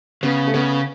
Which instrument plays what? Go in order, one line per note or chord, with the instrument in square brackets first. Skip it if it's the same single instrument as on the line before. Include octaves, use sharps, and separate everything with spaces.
[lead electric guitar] C#3 [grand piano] B3
[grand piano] A3
[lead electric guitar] C#3 [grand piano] B3